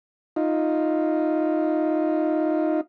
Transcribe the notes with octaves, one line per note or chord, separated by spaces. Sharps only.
D#4 F4